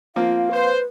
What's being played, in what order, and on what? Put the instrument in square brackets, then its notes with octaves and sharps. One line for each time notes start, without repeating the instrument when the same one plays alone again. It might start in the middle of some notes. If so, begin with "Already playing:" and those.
[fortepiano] F3 A#3 C4 [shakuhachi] F4 [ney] F5
[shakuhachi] B4 [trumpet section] C5